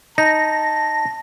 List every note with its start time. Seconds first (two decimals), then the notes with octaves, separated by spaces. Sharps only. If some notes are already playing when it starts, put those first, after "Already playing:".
0.18 D#4 A5 A#6